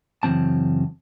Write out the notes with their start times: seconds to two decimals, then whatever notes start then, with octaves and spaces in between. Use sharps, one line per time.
0.23 F#2 C#3 E3 C4 A5